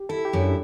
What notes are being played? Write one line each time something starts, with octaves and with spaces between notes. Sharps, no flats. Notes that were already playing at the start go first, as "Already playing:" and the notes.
Already playing: G4
E4 A4
G4
F#2
D4